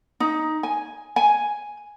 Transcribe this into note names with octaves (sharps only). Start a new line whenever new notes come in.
D#4
G#5
G#5